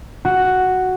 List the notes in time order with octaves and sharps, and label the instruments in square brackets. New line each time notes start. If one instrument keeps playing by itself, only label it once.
[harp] F#4